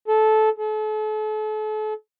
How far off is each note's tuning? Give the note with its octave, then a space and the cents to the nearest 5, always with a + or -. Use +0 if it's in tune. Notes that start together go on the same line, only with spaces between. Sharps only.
A4 -15
A4 -40